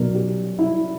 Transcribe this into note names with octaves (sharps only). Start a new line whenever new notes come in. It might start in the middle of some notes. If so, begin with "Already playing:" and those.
Already playing: B1 B2 F#3 A#4 D5
G4
E4